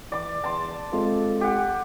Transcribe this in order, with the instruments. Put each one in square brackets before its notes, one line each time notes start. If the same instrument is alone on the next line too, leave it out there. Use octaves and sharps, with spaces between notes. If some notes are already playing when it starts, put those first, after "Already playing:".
[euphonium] E3 [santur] D5 D6
[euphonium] E2 [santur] A5 C6
[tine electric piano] G#3 C4 F4 [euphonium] A4
[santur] G4 F#5